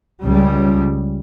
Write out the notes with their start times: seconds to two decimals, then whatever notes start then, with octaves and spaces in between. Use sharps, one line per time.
0.23 C#2 C#3 G3